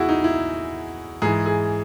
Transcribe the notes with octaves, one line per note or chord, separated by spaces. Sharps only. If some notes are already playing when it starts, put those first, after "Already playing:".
Already playing: E2 C#3 E4 F#4 G#4
D#4
E4
G#2 E3 G#4
G#4